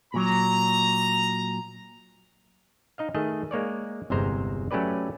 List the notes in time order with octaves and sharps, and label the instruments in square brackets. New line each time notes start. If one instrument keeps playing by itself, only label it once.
[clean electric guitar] A#2 F#3 [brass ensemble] A#5
[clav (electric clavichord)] D#4 D#5 F5
D#3 A3 G#4 D#5
G#3 A#3 C#5 D5
G1 E2 C3 G#3 C5 A#5
F#3 A3 C#4 G4 B4 D5